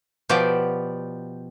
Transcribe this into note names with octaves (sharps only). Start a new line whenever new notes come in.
B2 F3 G4 D5